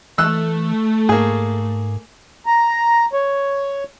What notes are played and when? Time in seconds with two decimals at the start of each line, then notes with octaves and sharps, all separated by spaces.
0.18 E3 A3 E6 F#6
1.09 G#2 A#3 G#4
2.46 A#5
3.13 C#5